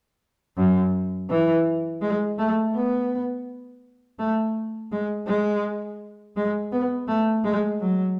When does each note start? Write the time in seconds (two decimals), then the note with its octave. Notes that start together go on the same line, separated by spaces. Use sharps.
0.57 F#2
1.30 E3
2.01 G#3
2.38 A3
2.75 B3
4.19 A3
4.92 G#3
5.27 G#3
6.36 G#3
6.72 B3
7.08 A3
7.44 G#3
7.80 F#3